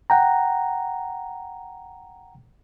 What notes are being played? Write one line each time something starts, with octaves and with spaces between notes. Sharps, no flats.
F#5 G5 A#5